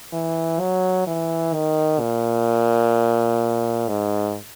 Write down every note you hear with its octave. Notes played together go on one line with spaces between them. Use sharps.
E3
F#3
E3
D#3
A#2
G#2